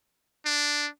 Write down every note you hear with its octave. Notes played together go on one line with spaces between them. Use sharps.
D4